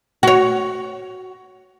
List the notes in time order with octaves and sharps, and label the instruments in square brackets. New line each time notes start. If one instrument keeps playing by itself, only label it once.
[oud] F#4 C#5